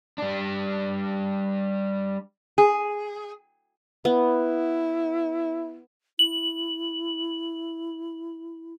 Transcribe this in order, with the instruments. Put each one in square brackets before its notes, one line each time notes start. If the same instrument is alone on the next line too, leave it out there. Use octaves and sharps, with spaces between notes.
[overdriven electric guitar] G3 D4
[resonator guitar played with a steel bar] G#4
[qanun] B3 [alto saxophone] E4
[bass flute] E4 [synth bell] F#7